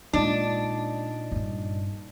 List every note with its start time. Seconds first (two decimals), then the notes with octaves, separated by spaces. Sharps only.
0.13 A#2 G#3 B3 D4 D#4 D5 D#5 A5
1.32 G2 C#4